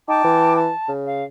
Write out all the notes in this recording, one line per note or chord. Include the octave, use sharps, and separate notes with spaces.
D#4 G5 A5 D6
E3
A5
C#3
F5